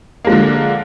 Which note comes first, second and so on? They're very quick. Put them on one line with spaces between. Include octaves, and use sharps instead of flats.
A#3 G#3 F3 D3